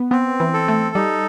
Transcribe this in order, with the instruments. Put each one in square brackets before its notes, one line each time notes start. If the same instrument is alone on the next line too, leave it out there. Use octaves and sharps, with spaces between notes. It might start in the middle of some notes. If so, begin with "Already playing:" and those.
Already playing: [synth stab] B3
[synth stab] B3 [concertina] C4
[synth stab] E3
[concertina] A4
[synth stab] A3
[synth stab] G3 [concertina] D#4